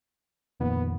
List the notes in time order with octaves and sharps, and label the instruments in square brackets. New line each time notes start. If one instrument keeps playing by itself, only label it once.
[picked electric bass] F2 A#2 D#3 [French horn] B3